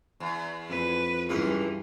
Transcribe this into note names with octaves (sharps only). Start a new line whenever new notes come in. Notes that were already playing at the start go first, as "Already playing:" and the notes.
E2
F2 B4
C#2 G2 E3 A#3